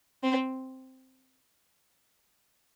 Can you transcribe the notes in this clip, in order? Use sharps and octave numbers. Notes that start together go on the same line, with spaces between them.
C4